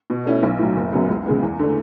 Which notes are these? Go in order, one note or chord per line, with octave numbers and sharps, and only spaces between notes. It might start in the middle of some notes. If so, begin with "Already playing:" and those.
B2
A3 C#4 E4
B1
A2 F#3
F#1
F#2 C#3 F#3 B3
C#2
C#3 G#3 B3
E2
D3 A3